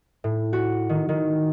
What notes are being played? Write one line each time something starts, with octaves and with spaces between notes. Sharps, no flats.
A2
F#4
D#3
D#3